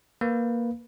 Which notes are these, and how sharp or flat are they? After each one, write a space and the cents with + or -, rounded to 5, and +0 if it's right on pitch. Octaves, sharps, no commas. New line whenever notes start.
A#3 +5 B4 +0